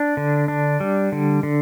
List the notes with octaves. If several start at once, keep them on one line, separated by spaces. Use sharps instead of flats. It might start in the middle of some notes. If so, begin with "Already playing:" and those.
Already playing: D4
D3
D4
G3
D3
D3